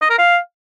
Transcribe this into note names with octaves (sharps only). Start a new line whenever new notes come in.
D#5
A#4
F5